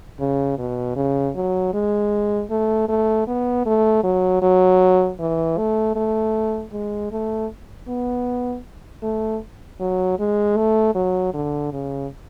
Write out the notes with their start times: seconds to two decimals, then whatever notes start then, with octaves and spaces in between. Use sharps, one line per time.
0.19 C#3
0.58 B2
0.96 C#3
1.35 F#3
1.74 G#3
2.50 A3
2.88 A3
3.27 B3
3.66 A3
4.04 F#3
4.42 F#3
5.20 E3
5.58 A3
5.95 A3
6.72 G#3
7.12 A3
7.88 B3
9.03 A3
9.80 F#3
10.19 G#3
10.57 A3
10.95 F#3
11.34 D3
11.73 C#3